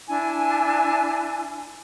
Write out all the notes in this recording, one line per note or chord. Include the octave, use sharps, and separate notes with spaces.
D4 E4 G#5